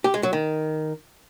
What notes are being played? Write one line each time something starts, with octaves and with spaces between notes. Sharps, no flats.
G4
G#3
F#3
D#3